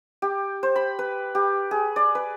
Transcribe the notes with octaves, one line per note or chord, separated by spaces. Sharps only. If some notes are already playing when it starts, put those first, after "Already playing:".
G4
C5
B5
B4
G4
G#4
D5
B4